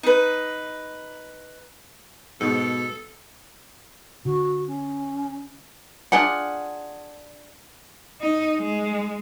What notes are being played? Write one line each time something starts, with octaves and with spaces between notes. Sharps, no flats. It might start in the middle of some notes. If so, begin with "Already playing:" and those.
D#4 B4
G#2 B2 A4
D3 F#4
C#4
D4 F4 G#4 F#5
D#4
G#3